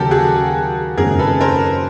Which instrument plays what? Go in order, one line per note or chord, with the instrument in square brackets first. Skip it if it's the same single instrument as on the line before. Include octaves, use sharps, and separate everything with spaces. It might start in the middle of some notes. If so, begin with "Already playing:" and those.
Already playing: [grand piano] D#2 C#3 F#3 A#3 [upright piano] G4 A4 A#4
[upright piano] F#4 G#4
[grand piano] F#1 F#2 D#3 G#3 C4 [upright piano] G#4 A#4
[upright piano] A4 B4
A#4 C5